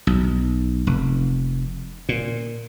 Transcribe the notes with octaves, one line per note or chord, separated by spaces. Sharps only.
B1
F1
A#2